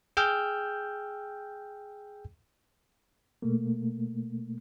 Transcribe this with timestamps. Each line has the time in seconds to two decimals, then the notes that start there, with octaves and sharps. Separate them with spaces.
0.17 G#4 G5 E6 F6 G6
3.42 B2 A3 A#3